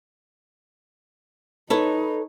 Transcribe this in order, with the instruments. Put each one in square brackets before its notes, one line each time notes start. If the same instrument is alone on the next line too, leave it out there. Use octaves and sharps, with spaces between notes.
[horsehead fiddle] D#4 [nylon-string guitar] A4 B4 C#5